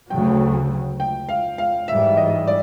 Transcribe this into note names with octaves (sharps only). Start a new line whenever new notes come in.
D2 C#3 F#3 G5
G5
F5
F5
G#2 E3 G3 E5
D#5
D5